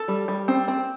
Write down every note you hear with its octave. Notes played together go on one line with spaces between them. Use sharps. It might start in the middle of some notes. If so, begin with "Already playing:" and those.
Already playing: A4
G3
G3
C4
C4